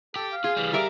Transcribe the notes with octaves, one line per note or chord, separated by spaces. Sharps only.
G4 A4
F5
F4 G#4
E3 G3
G3 A#4 E5 D6